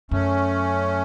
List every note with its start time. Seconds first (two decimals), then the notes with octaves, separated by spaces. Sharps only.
0.11 F#2 A3 C#4